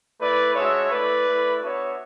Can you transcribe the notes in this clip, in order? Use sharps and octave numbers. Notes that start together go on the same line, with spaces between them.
A3 E4 B4 D5
G#3 D4 F#4 C#5 E5
A3 E4 B4 D5
A3 E4
B3 D4 F#4 C#5 E5